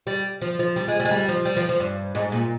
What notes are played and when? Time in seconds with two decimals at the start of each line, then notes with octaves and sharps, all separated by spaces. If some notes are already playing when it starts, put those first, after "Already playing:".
0.07 G3
0.41 F3
0.59 F3
0.76 G3
0.88 G#3
1.00 G3
1.05 G#3
1.11 G3
1.28 F3
1.45 G3
1.57 F3
1.69 F3
1.80 G2
2.15 G#2
2.32 A#2